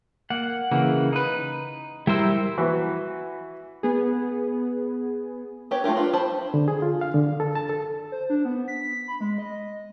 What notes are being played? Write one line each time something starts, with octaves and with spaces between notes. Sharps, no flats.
A#3 F#5
C#3 E3 A#3
D#4 B4
G3 E4 A#4 C5 E6
E3 F#4 B4
B3 G#4
B3 G4 C#5
A3 F4 G4 A#4
D4 F4 B4
C5 A5 B5
D3
G#4
F4
F5
D3
A4
A5
A4
C5
D4
B3
B6
B5
G#3
D#5